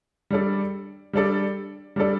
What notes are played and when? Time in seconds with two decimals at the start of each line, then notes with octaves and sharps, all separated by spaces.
0.30 G3 D4 A4 D5
1.13 G3 D4 A4 D5
1.96 G3 D4 A4 D5